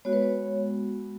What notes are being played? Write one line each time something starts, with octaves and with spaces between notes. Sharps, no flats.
G#3 B3 F#4 C#5
B4
C#5